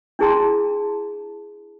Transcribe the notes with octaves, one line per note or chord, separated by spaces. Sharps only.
D4 E4 G#4 A5 A#5 C6